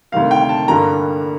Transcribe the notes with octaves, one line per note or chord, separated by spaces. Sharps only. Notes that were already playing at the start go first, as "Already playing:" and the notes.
D2 C3 D#3 G3 A#3 F5
G5
A5
G1 G2 D3 G3 A#3 A#5